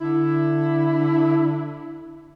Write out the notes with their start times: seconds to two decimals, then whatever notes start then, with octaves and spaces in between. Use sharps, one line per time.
0.01 D3 E4